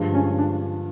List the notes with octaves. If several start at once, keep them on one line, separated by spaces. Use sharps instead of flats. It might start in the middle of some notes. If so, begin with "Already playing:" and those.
Already playing: G2 D3 F3 G#3
C#4
D4